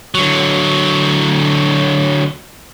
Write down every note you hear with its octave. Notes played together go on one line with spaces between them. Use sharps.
D3 F#3